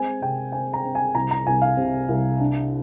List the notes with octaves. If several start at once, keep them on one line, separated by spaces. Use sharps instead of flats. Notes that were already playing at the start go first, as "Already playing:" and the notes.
Already playing: G#3 C4 G#5
C3 G5
C4 G#5
A#5
C4
G#5
C2 A#5
A#5
C2 G#5
F5
C3
C2
D4